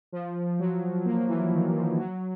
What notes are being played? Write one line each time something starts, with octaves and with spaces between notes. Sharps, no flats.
F3
F#3
A#3
E3
D#3
F3
F#3